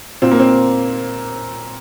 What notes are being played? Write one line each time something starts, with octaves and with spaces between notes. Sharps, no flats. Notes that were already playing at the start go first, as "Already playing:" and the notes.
A#2 C4
A#3
C4